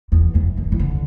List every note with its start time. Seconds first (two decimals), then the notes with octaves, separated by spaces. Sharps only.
0.12 E2
0.35 F#2
0.57 D3
0.72 E3
0.79 D3